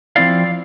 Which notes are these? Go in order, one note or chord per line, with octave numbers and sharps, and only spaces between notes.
F3 C4 E4 D5 F5